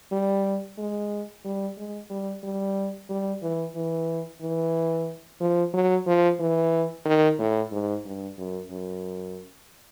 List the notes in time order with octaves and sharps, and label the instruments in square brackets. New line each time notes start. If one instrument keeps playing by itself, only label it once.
[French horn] G3
G#3
G3
G#3
G3
G3
G3
E3
E3
E3
F3
F#3
F3
E3
D#3
A2
G#2
G2
F#2
F#2